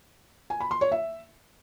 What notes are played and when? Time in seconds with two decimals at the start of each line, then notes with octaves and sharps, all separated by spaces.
0.50 G#5
0.60 B5
0.71 C6
0.81 C#5
0.92 E5